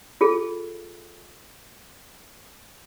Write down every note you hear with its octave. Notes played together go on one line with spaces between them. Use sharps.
F4 G#4 A4